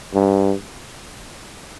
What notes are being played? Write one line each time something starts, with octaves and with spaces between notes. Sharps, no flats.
G2